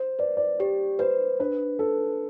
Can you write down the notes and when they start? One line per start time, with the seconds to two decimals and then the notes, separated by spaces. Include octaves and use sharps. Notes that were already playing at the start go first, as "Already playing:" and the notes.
Already playing: C5
0.19 B4 D5
0.37 D5
0.59 G4 D5
0.99 B4 C5
1.40 D4 B4
1.79 A4 B4